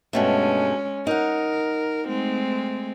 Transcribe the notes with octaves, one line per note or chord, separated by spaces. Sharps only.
G2 B2 G#3 A3 C#4
D#4 A#4 F#5
G#3 A3 C4